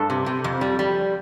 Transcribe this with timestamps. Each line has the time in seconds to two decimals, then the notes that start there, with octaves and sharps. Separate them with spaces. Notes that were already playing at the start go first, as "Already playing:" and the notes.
Already playing: G2 A4 A5
0.10 C3
0.26 C3
0.44 F2
0.61 G3
0.79 G3